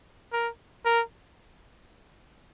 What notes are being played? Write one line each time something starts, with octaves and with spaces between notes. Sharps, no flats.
A#4
A#4